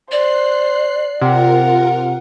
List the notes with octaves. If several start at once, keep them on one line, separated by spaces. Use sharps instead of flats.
C5 D5 F#6 C7
C3 F4 A#4 F#5